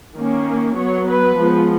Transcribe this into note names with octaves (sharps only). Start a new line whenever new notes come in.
D#3 A#3 C#4
F#3 B3 C#5
B4
F3 G#3 B3